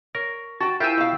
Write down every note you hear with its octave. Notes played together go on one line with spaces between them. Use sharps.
A#4 C#5
F#4 G5 A5
E4 F4 G4 A#4 C5 G5 G#5 E6
B2 F5